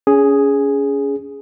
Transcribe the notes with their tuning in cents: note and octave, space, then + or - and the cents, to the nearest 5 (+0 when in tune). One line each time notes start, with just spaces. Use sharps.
C#4 +25 G#4 +0